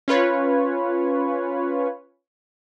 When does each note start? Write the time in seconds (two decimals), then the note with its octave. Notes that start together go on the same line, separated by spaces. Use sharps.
0.08 C#4 F4 B4 C#5